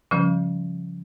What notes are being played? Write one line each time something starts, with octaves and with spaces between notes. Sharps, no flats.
C#3 F3 G3 C#4